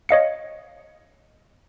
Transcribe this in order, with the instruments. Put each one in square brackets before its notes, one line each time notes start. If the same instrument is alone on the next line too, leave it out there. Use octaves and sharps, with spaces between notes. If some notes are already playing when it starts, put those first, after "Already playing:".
[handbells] C#5 D#5 F5 C#7